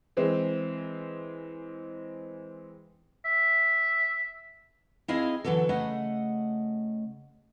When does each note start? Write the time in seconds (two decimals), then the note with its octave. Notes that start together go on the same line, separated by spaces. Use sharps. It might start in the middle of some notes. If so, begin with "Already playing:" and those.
0.17 E3 G#3 C4
3.25 E5
5.08 C4 E4 G#4 D#5 F5
5.44 D3 E3 F#3 A#3 A4
5.69 C#3 A3 D#5 F#5